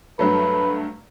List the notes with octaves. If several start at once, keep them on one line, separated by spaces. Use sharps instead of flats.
G2 F#3 A3 B4